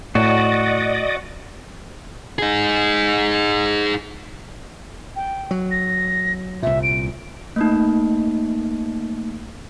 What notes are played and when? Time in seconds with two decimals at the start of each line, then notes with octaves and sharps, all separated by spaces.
0.15 A2 F#4 D5 D#5
2.39 D#4 G#4
5.16 G5
5.51 F#3
5.71 A#6
6.63 C2 A#2 E5
6.83 D7
7.56 A3 A#3 D#4